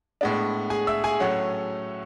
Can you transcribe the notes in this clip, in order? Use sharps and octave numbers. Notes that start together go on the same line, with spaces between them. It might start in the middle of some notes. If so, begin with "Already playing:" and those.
A2 G#3 B3 D4
G#4 G#5
E5 E6
G#4 G#5
A2 F#3 A3 C#4 F#5